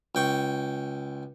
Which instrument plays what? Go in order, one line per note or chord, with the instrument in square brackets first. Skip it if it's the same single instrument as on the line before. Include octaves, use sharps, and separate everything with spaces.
[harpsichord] C#2 G5 C#6